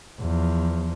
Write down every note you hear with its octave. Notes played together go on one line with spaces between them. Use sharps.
E2 F3